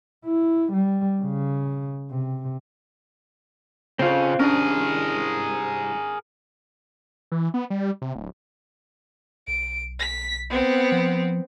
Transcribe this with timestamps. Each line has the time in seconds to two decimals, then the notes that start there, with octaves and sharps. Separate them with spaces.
0.25 E4
0.73 G3
1.23 C#3
2.10 C3
3.99 C#3 C4 F4
4.40 C2 C#4 D4 G#4 A#4
7.32 E3
7.54 B3
7.70 G3
8.02 C3
8.16 D1
9.48 B1 D7
10.00 B6
10.50 B3 C4
10.92 F3